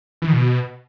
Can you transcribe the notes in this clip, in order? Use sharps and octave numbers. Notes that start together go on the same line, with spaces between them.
E3
D#3
B2